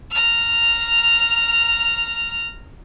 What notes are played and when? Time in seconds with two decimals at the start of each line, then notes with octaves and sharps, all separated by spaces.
0.11 A#5 F6